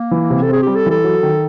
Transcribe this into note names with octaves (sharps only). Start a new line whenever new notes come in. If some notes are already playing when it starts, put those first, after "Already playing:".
Already playing: A#3
E3
C3
A4
C4 G#4
G3 G4
A4
E3 A4
F#3
D#3